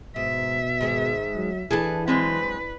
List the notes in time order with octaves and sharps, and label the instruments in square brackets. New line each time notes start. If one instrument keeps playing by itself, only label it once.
[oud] G#2 [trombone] B2 [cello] E5
[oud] G#2 D#3 G#3
[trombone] F#3
[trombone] E3 [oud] D4 E4 [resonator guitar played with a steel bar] G#4 A4 B4
[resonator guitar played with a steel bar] F#3 G#3 C4 [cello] B4